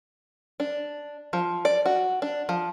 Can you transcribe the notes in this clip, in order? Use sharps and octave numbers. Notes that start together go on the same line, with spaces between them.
D4
F3
D5
F#4
D4
F3